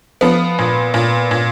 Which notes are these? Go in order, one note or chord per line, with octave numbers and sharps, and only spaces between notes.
F3 B3
A#2
A#2
A#2